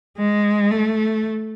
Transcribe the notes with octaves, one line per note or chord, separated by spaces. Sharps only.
G#3
A3